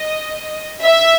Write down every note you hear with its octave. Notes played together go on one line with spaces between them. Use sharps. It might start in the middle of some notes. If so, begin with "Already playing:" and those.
Already playing: D#5
E5